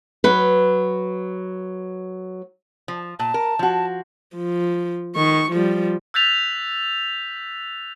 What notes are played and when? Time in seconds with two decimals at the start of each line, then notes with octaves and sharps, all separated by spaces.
0.24 F#3 B4
2.88 F3
3.19 A#2 A5
3.34 A#4
3.59 F3 F#4
4.36 F3
5.16 D#3 C#6
5.51 F3 G3
6.14 E6 F#6 G6 A6 B6 F7